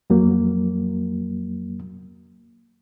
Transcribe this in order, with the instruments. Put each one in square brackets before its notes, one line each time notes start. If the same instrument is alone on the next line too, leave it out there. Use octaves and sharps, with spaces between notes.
[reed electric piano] F2 F#3 A#3